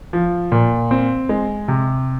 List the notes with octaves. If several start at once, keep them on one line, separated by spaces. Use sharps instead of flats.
F3
A#2
C4
G#3
C3